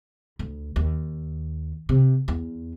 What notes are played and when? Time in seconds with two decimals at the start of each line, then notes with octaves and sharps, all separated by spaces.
0.39 D2
0.76 D#2
1.89 C3
2.28 E2